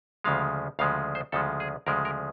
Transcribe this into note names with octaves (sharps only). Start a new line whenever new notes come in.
D2 C#3 F3 G#3 F5
D2 C#3 F3 G#3 F5
C5
D2 C#3 F3 G#3 A4
G#4
D2 C#3 F3 G#3 A#4
A#4